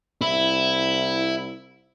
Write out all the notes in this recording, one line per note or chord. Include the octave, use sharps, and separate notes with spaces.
C2 E4